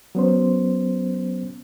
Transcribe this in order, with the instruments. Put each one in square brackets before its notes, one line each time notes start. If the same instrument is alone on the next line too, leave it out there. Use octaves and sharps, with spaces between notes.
[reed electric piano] F#3 B3 C#4 C5